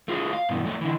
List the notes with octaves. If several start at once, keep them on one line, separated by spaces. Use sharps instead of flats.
A3 F4 G#4
F5
G2 B2 E3
F2 A2 A3
D3 E3